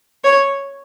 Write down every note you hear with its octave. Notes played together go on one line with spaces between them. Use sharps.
C#5